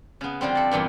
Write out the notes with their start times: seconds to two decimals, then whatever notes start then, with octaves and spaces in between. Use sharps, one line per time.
0.21 C#3 B3
0.41 D3 F3 G3 C4
0.55 A4 D5
0.71 E2 G2 A#2 E3